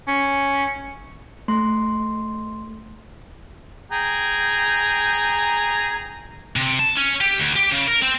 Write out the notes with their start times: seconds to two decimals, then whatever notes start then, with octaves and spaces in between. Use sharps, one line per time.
0.08 C#4
1.48 A3 C6
3.92 G#4 G5 A#5
6.56 C3
6.79 A5
6.96 C#4
7.21 G4
7.38 D2
7.56 G4
7.72 C#3
7.88 A#4
8.02 C4